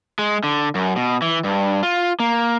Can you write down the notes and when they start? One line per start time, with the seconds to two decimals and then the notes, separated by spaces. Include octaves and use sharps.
0.19 G#3
0.43 D3
0.75 F#2
0.96 B2
1.22 E3
1.44 G2
1.83 F4
2.20 A#3